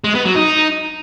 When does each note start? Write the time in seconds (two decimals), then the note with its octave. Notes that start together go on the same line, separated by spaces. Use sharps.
0.04 G#3
0.15 B3
0.25 F#3
0.36 D#4